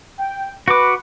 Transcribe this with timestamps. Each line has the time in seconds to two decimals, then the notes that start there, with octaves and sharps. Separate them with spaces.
0.19 G5
0.68 F#4 B4 D6